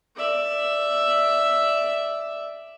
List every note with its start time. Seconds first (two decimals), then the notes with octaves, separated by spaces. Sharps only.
0.16 D5 E5